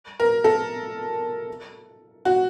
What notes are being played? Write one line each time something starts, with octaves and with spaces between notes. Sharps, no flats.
A#4
A4
F#4